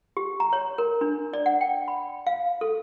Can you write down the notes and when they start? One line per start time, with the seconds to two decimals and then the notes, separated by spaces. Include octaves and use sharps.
0.17 G4
0.40 A#5
0.53 C#5
0.78 A#4
1.01 D4
1.33 D5
1.46 F#5
1.61 G5
1.88 B5
2.27 F5
2.61 A4